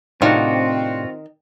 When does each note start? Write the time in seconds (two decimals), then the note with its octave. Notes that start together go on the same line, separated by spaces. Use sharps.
0.22 A2 C3 D#3 C4 D4 F4 F#4